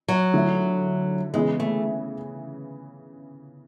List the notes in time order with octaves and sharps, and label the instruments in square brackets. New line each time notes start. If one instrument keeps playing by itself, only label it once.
[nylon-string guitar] F#3
[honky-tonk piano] D3 A3 E4
[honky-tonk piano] C#3 E3 B3 [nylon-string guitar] G#3
[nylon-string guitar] A3